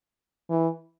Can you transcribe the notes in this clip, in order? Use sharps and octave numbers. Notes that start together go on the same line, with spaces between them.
E3